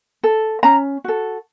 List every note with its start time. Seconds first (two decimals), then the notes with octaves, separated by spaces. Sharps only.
0.24 A4
0.63 C#4 A#5
1.04 F#4 A4